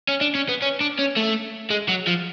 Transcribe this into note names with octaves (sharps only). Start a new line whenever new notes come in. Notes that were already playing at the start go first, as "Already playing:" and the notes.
C#4
D4
C#4
B3
C#4
D4
C#4
A3
G#3
F#3
F3